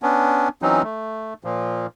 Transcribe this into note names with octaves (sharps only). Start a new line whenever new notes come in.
B3 C#4 D4
E3 F#3 C4 C#4 D#4
A3
A#2 F3